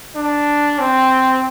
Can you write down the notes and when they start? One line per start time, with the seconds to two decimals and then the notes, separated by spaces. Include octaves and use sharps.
0.16 D4
0.79 C4